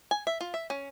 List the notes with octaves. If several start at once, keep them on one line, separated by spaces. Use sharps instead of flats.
G#5
E5
F4
E5
C#4